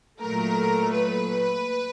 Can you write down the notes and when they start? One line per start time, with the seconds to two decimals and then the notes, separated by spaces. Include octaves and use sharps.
0.21 A#2 F#3 A3 A#4
0.94 B4